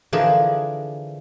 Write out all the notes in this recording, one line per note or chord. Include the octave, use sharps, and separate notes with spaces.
D3 E3 F3 D4 G#4 A#4